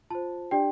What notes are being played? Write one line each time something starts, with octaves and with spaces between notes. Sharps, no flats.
F4 C5 A5
D4 G4 D5 G5